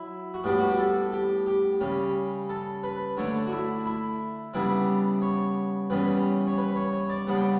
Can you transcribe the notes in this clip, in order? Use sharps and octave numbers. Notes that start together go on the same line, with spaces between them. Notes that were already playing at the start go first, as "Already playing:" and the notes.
Already playing: F#3 E4
F#4
A2 G3 B3 D4 G4
F#4
G4
A4
G4
G4
C#3 G3 C#4
A4
B4
D3 A3 D4 C#5
F#4
E4
E4
C#3 G3 B3 D4 E4
C#5
E2 C#3 G3 C#4 B4
C#5
B4
C#5
C#5
D5
C#3 G3 B3 D4 F#5
G5